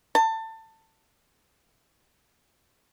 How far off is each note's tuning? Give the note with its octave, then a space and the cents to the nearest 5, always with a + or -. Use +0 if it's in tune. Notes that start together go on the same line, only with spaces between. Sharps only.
A5 +25